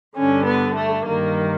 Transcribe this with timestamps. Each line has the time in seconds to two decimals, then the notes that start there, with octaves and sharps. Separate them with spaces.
0.17 G2 D3 C#4
0.47 B3
0.76 A3
1.05 G2 D#3 A#3